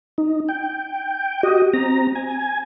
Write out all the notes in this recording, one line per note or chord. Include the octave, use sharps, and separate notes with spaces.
D#4
G5
F#4 G4 D#5
C4 A#5
G#5